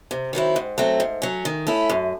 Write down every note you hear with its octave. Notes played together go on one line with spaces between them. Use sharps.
C3
D#3 F#3 C4 E4
G#2
F#3 A3 C4
G#2
F#3 C#4
D#3
A3 C#4 E4
F#2